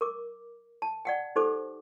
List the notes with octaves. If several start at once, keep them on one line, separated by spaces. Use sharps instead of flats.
A#4 D6
A5
D5 F#5 G5
D#4 G4 A4 C5 D6